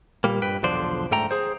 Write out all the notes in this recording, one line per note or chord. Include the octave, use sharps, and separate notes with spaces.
A#2 G3 A#3
G2 B4 G5
B1 E2 D3 F3 C5 D5
G#2 D3 A3 G5 A#5
G#4 C5